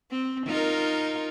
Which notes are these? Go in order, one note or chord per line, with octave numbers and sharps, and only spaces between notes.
C4
D#4 F4 A#4